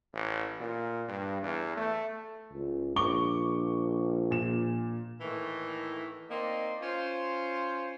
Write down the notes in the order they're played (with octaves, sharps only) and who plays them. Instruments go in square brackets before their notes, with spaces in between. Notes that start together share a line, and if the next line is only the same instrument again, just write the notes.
[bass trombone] A1
A#2
G2
E2
A3
C#2
[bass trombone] A#1 [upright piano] C#6 D6 G7
[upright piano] A#2 E7
[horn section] A2 D#3 E3 A3 A#3
A#3 C4 D#4 D5 C6
C#4 F4 C5